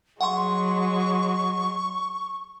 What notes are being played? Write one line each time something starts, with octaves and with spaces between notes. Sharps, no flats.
F#3 G#3 F#5 C6 C#6